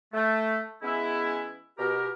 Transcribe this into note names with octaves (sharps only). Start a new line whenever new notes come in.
A3
E3 G#3 B3 C#4 E4
B2 G4 A#4